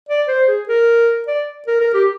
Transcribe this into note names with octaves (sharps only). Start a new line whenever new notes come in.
D5
C5
G#4
A#4
D5
A#4
A#4
G4